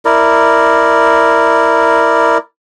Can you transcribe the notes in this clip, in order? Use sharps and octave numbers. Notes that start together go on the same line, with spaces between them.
E4 A#4 D5